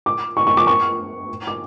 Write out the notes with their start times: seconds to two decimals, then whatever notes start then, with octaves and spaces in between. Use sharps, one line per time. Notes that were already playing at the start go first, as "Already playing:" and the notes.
0.06 D6
0.37 C#6
0.47 C#6
0.57 D6
0.67 C#6
1.47 D6